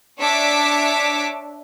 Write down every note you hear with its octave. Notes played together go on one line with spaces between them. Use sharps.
D4 C#5 E5 D6 B6